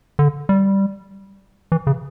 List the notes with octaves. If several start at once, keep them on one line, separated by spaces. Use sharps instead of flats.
D3
G3
E3
C#3